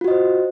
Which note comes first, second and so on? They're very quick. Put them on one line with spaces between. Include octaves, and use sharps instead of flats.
F4 F#4 D#5 C5